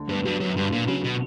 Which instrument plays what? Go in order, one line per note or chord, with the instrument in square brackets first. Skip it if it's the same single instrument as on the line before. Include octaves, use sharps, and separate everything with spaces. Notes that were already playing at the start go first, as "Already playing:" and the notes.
Already playing: [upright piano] D2 D3
[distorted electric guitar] G2 [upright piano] B3
[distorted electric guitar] G2 [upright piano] F#3
[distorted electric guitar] F#2 [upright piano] F#3
[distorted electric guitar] G2 [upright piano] D3
[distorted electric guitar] A#2 [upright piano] D3
[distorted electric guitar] C#3 [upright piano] F#3
[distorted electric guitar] B2 [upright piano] D3